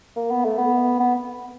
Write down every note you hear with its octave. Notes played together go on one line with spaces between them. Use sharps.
A#3
B3
A3
B3
B3